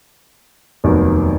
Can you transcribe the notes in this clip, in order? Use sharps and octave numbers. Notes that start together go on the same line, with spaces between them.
F1 D#2 D#3 F#3 B3